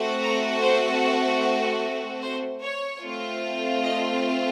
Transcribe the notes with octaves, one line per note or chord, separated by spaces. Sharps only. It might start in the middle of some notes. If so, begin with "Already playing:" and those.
Already playing: A3 C4 F#4
A#5
C5
C5
C#5
A3 C4 F4
D#5